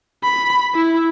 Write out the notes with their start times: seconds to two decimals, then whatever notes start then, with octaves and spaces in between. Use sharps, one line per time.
0.24 B5
0.75 E4